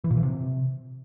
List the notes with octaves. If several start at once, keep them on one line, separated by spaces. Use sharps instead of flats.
E3
A#2
E3
C3